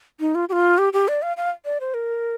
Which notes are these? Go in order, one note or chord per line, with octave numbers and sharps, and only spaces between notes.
D#4
F4
G4
F4
G4
G4
D5
F5
F5
D5
C5
A#4